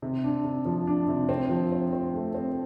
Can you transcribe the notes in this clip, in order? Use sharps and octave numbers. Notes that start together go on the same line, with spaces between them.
C3
D4
C3
F3
D4
C3
C4
F3
C4
C4
A3
C4